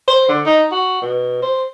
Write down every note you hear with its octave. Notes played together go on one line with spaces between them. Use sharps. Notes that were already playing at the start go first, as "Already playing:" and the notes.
C5
D3
D#4
F#4
B2
C5